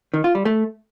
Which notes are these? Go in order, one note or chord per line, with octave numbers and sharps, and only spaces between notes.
D#3
F4
G3
A3